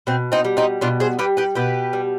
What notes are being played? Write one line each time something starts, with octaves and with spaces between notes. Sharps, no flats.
B2 C4
C4 D#4
G3
C4 D#4
B2 D4 F4
G#4 C5
G3 G4 B4
G4 B4
B2 G4 B4
G3